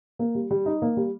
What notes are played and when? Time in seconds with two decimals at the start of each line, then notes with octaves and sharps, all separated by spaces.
0.19 A#3
0.35 G3
0.51 G3
0.66 D#4
0.82 A#3
0.97 G3